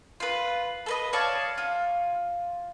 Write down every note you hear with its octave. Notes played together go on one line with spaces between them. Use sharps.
F4 B4
A4 B4 D#5
C#5 D5 F5 A5
F4